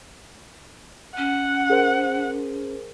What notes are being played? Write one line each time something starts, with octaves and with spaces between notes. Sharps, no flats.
C#4 F#5
G#4 A#4 C5